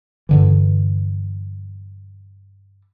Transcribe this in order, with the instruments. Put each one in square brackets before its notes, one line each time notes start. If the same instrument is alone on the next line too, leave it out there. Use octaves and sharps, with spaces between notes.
[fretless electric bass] G2 D3 E3